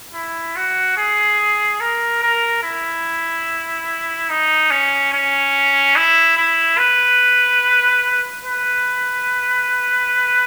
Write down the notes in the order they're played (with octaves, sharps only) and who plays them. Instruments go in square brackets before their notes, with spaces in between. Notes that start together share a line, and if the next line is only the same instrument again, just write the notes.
[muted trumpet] E4
F#4
G#4
A#4
A#4
E4
D#4
C#4
C#4
E4
E4
B4
B4